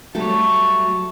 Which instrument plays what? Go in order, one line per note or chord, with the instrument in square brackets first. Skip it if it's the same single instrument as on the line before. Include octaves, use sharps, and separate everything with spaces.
[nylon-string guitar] F#3 G3 A3 [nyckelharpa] C#5 A5